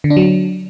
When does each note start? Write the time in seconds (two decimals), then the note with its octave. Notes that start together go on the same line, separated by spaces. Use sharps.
0.04 D3
0.10 D4
0.17 F#3